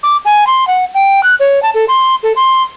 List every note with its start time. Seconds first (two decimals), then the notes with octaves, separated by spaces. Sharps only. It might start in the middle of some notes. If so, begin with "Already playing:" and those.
0.03 D6
0.25 G#5
0.47 C6
0.68 F#5
0.94 G5
1.23 F#6
1.40 C#5
1.63 A5
1.74 A4
1.88 C6
2.23 A4
2.36 C6